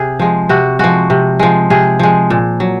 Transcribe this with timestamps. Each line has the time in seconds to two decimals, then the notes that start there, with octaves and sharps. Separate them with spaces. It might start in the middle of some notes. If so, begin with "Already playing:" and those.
Already playing: C3 G#4
0.19 F3 G#3
0.49 C3 F#4
0.79 F3 G#3 F#4
1.10 C3
1.39 F3 G#3
1.70 C3 G#4
2.00 F3 G#3
2.30 A#2
2.60 F#3